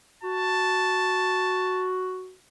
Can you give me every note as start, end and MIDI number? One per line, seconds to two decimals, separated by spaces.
0.24 2.33 66
0.24 1.89 81